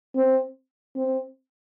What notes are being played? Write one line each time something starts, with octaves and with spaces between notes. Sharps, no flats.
C4
C4